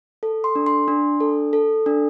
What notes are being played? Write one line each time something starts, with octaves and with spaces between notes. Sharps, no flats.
A4
C6
D4
C6
D4
A4
A4
D4